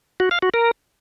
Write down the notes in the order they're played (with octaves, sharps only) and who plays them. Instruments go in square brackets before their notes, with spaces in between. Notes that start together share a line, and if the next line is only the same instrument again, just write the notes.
[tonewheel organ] F#4
F5
F#4
A#4